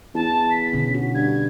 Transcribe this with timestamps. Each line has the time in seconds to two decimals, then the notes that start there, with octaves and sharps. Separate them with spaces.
0.14 E2 A5
0.50 B6
0.73 B2 D3 C#4
0.94 F#4
1.14 G2 G#6